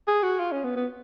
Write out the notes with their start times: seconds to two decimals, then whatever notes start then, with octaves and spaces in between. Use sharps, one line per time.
0.08 G#4
0.23 F#4
0.40 F4
0.52 C#4
0.64 B3
0.76 B3